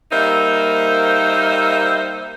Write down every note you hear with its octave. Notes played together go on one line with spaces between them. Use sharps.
G3 A#3 D#4 C5 E5